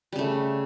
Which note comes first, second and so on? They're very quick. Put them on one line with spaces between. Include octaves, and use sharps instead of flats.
G3 C#3 A3